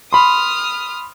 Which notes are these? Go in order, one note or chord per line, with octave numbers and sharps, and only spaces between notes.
B5 C6 D#6 F6